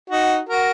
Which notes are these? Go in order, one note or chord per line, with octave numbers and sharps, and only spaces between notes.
D#4 F#4
F#4 A#4